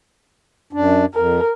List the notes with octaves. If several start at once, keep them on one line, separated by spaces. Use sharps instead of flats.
F#2 D4
F2 A#4